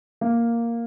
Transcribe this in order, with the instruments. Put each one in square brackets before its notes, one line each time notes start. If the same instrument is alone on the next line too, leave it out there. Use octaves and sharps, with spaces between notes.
[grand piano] A#3